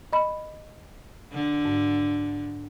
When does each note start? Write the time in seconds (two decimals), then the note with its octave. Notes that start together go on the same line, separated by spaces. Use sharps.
0.13 D#5 B5
1.32 D3
1.65 G#2